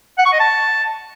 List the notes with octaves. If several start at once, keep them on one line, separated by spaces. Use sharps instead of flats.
F#5
C#6
D#5
A5